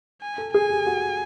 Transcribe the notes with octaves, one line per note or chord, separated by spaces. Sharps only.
G#5
A4
G#4 G#5
G4
F#4